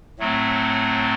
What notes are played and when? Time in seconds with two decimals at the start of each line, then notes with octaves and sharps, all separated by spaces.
0.19 A2 F#3 A3 C4